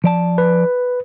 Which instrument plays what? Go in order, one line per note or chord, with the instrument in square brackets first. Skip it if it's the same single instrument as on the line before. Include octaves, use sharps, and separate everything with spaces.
[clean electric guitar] F3 D5 A5
[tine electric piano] B4